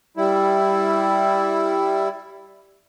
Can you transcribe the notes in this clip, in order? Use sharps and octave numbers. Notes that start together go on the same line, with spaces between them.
G3 E4